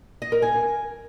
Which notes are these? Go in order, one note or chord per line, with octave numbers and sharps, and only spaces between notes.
D#5
A#4
G#5